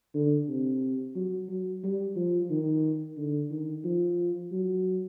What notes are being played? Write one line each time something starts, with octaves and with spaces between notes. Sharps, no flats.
D3
C3
F#3
F#3
G3
F3
D#3
D3
D#3
F3
F#3